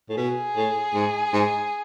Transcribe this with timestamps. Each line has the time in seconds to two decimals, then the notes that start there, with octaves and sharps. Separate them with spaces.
0.09 A2
0.17 B2 G#4
0.56 A2
0.94 G#2
1.33 G#2